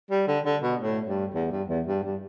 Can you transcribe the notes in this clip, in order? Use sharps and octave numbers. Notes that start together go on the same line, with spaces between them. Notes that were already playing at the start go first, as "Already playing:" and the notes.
G3
D3
D3
B2
A2
G2
E2
G2
E2
G2
G2